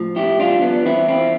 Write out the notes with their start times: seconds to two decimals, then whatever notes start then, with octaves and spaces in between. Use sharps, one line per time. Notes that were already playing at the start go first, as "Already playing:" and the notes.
Already playing: A2 F3
0.16 E4 G4
0.39 G3 D4 F4
0.62 B3 D4
0.85 E3 C4 E4
1.08 C4 E4